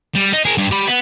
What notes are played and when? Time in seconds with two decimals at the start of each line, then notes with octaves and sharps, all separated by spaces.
0.15 G3
0.33 D#4
0.45 G#4 A#4
0.58 G2
0.71 G4 B5
0.87 B3